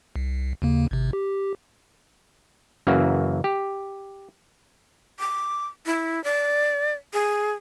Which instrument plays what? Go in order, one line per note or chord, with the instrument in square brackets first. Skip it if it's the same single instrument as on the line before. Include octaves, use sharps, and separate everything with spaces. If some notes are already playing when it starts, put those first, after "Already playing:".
[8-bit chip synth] C2
D#2 C#3 A#3
G#1 C3
G4
[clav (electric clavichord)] F#2 C#3 E3 A#3 F#4
G4
[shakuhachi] D6
E4
D5
G#4